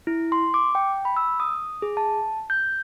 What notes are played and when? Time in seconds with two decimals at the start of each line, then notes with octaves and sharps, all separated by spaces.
0.07 E4
0.32 C6
0.54 D6
0.75 G5
1.05 B5
1.17 E6
1.40 D#6
1.82 G#4
1.97 A5
2.50 G6